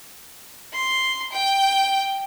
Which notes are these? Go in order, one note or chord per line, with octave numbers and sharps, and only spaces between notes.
C6
G5